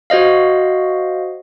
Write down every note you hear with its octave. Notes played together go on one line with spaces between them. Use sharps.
F#4 C5 D#5 F5